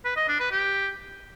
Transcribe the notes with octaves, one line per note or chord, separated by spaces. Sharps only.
B4
D#5
D4
B4
G4